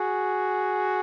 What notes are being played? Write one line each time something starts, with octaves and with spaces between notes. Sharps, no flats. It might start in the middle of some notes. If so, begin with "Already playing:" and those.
Already playing: F#4 G#4